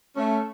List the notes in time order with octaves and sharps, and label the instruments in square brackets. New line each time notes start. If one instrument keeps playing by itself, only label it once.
[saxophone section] A3 C#4